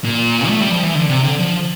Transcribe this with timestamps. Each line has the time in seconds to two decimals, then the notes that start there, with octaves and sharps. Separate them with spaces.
0.05 A#2
0.49 A3
0.61 G3
0.71 F3
0.83 E3
0.95 D3
1.10 C3
1.24 D3
1.39 F3